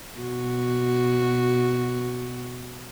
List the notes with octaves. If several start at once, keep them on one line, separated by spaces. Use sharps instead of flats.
B2 F#4